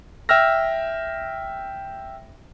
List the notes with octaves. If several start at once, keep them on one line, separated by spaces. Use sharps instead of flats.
E5 G5 E6 F6 A#6